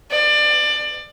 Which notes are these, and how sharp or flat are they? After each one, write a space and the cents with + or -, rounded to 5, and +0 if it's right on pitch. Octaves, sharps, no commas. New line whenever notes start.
D5 +25